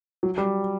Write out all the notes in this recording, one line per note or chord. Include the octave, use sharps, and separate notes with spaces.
F#3
G3